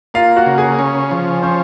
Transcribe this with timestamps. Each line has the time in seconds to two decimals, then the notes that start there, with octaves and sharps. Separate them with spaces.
0.14 A#3 F4 F5
0.36 F#4 F#5
0.46 C#3
0.58 G#4 G#5
0.79 C#4
1.11 F3
1.42 C#4 C5 C6